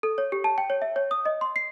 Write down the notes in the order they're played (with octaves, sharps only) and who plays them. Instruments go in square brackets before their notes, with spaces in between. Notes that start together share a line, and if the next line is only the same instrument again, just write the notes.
[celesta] A4
C#5
G4
A5
G5
C#5
E5
C#5
D#6
D#5
C6
C7